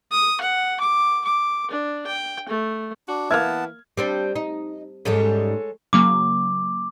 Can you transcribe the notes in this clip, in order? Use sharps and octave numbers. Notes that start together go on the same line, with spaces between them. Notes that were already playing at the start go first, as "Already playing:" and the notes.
D#6
F#5
D6
D6
D4
G5
A3
D4 F#4
E3 A#3 B3 E5 F#5 A5 F6 G#6
G3 C4 D4
D#4
G#2 G3 G#3 C#4 A4 C#5
C#3 F#3 A#3 D6